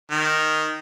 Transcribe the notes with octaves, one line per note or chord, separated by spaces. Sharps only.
D#3